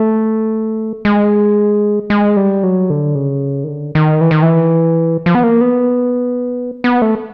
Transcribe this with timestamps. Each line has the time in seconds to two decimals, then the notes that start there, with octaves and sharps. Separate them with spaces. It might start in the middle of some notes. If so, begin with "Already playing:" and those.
Already playing: A3
1.05 G#3
2.10 G#3
2.37 G3
2.63 F#3
2.90 D3
3.15 C#3
3.64 D#3
3.68 D3
3.95 D#3
4.21 E3
4.31 D#3
4.42 E3
5.26 F3
5.35 B3
5.43 A#3
5.61 B3
6.84 B3
7.02 A3